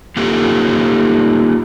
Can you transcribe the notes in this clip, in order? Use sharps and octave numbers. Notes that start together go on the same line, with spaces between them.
A#3 D#4 F4 G4 A4